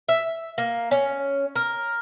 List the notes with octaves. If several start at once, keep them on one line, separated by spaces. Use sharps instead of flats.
E5
A#3
C#4
A#4